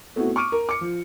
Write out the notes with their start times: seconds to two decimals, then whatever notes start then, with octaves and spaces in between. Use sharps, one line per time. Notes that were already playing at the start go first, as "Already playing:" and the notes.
0.16 A3 B3 C4 E4 F#4
0.36 C#6 D6 F6 D7 D#7
0.52 A#4
0.69 D6 C#7
0.81 F3